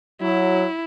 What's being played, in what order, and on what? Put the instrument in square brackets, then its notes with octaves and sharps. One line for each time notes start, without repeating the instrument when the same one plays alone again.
[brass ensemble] F#3 [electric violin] E4